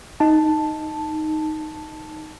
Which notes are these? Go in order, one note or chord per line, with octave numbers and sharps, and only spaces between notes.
D#4 A5